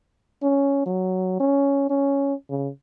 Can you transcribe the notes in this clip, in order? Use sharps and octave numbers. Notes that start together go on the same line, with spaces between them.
C#4
F#3
C#4
C#4
C#3